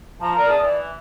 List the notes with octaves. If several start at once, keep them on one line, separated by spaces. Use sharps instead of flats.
F3 A5 A#5
A#4 D5
E2 A5 D#6
E3